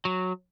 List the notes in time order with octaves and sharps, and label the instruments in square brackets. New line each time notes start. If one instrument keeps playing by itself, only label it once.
[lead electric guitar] F#3